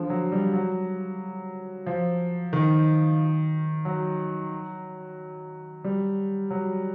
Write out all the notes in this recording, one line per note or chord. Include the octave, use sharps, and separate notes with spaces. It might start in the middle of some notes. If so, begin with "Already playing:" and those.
Already playing: D3 F3
F#3
G3
F#3
F3
D#3
F#3
G3
F#3